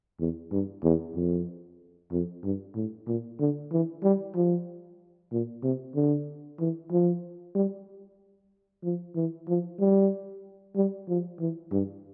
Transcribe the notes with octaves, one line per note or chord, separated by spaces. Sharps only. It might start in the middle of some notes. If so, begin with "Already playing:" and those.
E2
G2
E2
F2
F2
G2
A2
A#2
D3
E3
G3
F3
A#2
C3
D3
E3
F3
G3
F3
E3
F3
G3
G3
F3
E3
G2